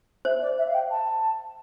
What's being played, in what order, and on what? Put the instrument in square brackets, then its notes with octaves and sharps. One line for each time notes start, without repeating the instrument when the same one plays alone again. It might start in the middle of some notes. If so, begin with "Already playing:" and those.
[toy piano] C5 [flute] E5
[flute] D5
E5
F5
G5
A5